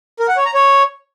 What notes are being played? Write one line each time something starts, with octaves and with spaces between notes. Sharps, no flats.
A#4
F#5
C#5
A#5
C#5